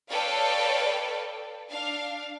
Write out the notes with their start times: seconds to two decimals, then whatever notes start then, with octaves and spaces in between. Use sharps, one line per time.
0.10 A4 B4 C#5 D5 F5 G5
1.70 D4 F5